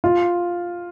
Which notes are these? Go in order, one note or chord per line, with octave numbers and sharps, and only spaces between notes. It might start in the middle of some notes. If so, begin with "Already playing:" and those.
F4